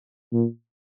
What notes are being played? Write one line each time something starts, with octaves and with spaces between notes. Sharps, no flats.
A#2